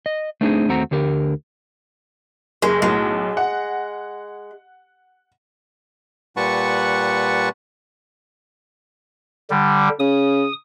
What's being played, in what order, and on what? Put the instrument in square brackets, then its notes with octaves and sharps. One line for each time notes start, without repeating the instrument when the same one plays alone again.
[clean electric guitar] D#5
A3 B3 C4 D4 D#4 G#4
D#2 A3 C4 F#4 A#5
D2 D3 G4 A#4
[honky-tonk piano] F#1 [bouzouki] G#3
[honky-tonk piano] B1 A2 [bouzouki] G#3
[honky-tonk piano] F#5
[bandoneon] A#2 G3 B4 F#5 A5 C#6
[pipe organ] D3 G3
[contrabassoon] C#3 [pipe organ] D#6